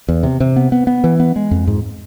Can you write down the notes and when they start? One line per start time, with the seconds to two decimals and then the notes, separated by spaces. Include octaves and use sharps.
0.08 E2
0.23 C3
0.40 C3
0.56 B3
0.72 B3
0.87 B3
1.04 E3
1.20 B3
1.36 G#3
1.51 F2
1.67 G#2